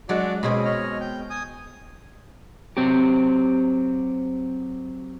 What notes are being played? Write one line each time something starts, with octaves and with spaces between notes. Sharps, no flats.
F#3 G#3 D4 F#4 D5
B2 G#3 C4 C#4 G#4 B5
C#5 D#5 F6
G5
G#5 D#6
F#3 C4 G4